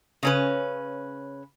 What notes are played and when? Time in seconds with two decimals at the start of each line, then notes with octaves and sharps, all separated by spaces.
0.23 C#3 C#4 B4